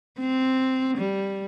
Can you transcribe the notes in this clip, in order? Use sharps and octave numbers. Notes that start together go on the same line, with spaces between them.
C4
G3